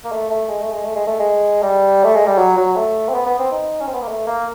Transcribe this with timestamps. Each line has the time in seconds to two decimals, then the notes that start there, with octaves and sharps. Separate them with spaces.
0.04 A#3
0.12 A3
0.30 A3
0.49 G#3
0.61 A3
0.72 G#3
0.84 A3
0.96 G#3
1.07 A3
1.19 G#3
1.62 G3
2.04 A3
2.15 G#3
2.27 G3
2.38 F#3
2.57 F#3
2.76 A3
3.09 C4
3.14 B3
3.26 B3
3.39 C4
3.52 D#4
3.81 C#4
3.88 C4
3.94 B3
4.02 A#3
4.08 A3
4.27 A#3